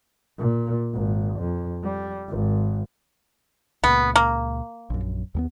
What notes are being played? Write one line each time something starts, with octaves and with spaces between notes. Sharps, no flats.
A#2
G#1
F2
G3
G#1
C#2 A#2 B3
A#3
A#1 F#2
D#2 G3 B3